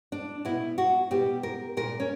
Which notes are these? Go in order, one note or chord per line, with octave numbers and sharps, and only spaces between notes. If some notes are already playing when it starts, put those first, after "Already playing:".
D4
B2 E4
F#4
B2 G4
A#4
A#2 A#4
C#4